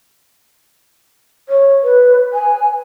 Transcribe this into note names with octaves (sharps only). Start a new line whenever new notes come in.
C#5
B4
G#5